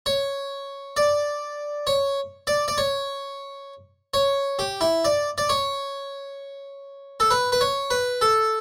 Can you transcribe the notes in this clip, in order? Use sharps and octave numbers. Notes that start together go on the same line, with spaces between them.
C#5
D5
C#5
D5
D5
C#5
C#5
G4
E4
D5
D5
C#5
A4
B4
B4
C#5
B4
A4